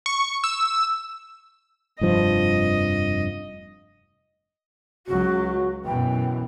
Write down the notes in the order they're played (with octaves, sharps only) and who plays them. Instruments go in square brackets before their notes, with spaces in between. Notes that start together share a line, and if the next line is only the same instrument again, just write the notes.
[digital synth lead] C#6
E6
[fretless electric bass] F1 G2 F3 [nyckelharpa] D#5
[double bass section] C#2 F#3 [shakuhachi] F#4
[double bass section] F#2 B2 E3 [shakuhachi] G5